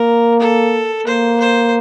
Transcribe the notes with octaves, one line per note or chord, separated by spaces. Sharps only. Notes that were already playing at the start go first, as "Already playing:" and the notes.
Already playing: A#3 A#4
A4
A#3 C5
C5